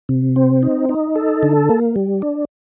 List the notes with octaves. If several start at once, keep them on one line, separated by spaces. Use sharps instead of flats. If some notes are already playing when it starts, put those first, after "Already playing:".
C3
C4
D#4
D#4
A4
D3
A#3
G3
D4